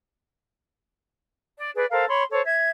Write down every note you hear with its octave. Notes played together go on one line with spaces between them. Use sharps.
D5
G#4 B4 D5
A4 A#4 C5 F5
C#5 B5 C6
A4 C5 C#5
E5 G#6